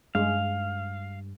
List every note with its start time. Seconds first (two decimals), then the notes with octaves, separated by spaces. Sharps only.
0.15 G2 G#3 F5